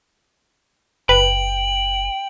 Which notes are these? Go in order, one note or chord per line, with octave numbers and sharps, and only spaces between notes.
F#1 B4 G5 F#7